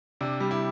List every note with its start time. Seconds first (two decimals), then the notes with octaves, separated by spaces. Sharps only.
0.21 C3 D4
0.40 G3
0.51 E4